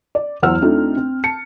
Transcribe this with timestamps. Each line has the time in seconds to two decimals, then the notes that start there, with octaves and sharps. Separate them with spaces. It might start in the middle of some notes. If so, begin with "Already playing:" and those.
0.15 D5
0.42 E2 F#3 C5 F#5 E6 F6
0.62 A3 C4 D4 D#4 F4
0.97 C4
1.24 A5 C#7